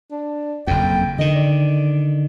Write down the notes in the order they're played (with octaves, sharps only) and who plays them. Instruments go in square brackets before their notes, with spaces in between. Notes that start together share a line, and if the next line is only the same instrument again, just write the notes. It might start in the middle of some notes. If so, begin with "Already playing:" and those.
[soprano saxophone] D4
[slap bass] F#1 F2 [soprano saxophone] G5
[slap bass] D3 D#3 [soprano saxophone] D#5
[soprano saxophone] D5